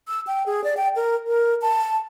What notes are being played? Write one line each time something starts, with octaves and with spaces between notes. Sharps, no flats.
E6
G5
G#4
D5
G5
A#4
A#4
A5